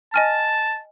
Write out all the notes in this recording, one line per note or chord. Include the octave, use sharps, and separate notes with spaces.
D#5 G#5 A5 F6